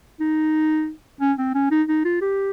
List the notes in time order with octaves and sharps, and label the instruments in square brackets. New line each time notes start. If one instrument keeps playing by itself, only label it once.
[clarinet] D#4
C#4
C4
C#4
D#4
D#4
F4
G4